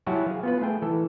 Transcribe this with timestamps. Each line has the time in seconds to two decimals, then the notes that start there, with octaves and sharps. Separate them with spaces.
0.06 F#3 E4 F#4 G4 G#5 A5
0.27 G#4 F5
0.43 B3 F4 B4
0.62 A3 G#4 G5
0.82 E3 A4